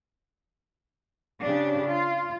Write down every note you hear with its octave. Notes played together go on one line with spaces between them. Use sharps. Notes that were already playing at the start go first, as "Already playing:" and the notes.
C#3 D4 G4
F4